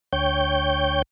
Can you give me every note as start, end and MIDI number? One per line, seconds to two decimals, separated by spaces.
0.13 1.02 38
0.13 1.02 73
0.13 1.02 79
0.13 1.02 91